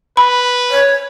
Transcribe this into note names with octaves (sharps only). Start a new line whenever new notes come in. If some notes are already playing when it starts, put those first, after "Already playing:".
B4 B5
C#5